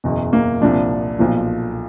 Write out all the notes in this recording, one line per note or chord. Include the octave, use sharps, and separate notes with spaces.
F#1 E2 B2
A#3
C2 A#2 F3 D4
B1 A#2 F3